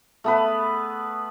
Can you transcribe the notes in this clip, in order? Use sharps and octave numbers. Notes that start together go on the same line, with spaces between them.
A3 B3 B4